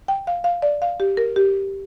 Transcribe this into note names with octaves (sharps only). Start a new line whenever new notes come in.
G5
F5
F5
D5
F5
G4
A#4
G4